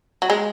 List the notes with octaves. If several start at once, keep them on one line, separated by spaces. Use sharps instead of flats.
F#3
G#3